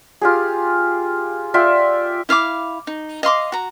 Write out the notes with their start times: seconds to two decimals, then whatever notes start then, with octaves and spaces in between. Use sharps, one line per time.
0.21 F4 G4 G#4
1.54 F4 D5 E5 G5
2.29 E4 F5 G#5 D6
2.87 D#4
3.23 D#5 F5 C6 D6
3.52 F#4 A#5